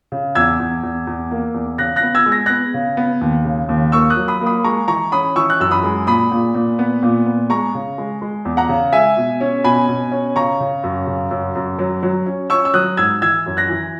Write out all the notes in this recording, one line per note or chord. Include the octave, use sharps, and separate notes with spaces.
C#3
E2 E6 G#6
E2
E2
E2
A#3
E2
C#3 F#6 A#6
F#6 A#6
B3
E6 G#6
G#3
A#6
B3 F#6 A#6
C#3
B3
D#2
C#3
D#2
A#3 C#6 E6
D#6 F#6
F#3
B5 D#6
A#3
B5 D#6
G#3 A#5 C#6
E3 A#5 C#6
C#4 B5 D#6
E3 C#6 E6
F#6
F#2 E6
B5 D#6
G#3
A#2 B5 D#6
A#2
A#2
B3
A#2
B3
G#3 A#5 C#6
C#3
G#3
G#3
E2
F#5 A#5
C#3
G#3 E5 G#5
B2
C#4
B2 G#5 B5
B2
C#4
C#3 A#5 C#6
C#3
F#2
C#3
F#2
F#2
F#3
F#3
C#4
C#4 C#6 E6
E6
F#3 D#6 F#6
G#2 E6 G#6
E3 E6 G#6
F#2
F#6 A#6
E3